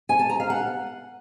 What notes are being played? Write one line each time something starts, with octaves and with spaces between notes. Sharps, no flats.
G#5
A5
A#5
F5
F#5